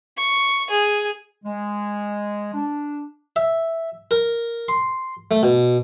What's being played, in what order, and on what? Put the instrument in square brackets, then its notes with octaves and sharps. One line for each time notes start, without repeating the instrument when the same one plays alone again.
[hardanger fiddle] C#6
G#4
[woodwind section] G#3
D4
[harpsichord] E5
A#4
C6
A3
B2